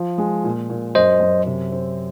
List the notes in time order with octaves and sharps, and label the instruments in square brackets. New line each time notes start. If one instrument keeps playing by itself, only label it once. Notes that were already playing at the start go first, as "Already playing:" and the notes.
Already playing: [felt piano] F3
G#3
A#2
A#2
[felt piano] F#2 [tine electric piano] C5 D#5
[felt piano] F#2
C3
C4